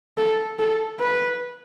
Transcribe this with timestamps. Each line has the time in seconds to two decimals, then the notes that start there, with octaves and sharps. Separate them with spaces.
0.18 A4
0.59 A4
1.00 B4